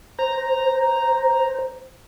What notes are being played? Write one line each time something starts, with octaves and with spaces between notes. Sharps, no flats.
C5 A#5